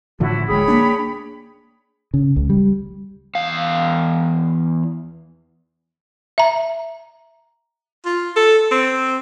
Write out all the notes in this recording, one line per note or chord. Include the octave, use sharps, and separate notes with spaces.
A2 D3 F3 E4 F#4
D1 D2 G#3 G#4 C#5 G5 B5
A#3 D4
C#3
C#2
G3
E2 F5
E5 A#5
F4
A4
C4